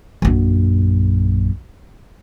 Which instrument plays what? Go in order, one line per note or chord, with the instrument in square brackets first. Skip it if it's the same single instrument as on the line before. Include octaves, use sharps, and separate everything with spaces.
[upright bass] A#1 F#2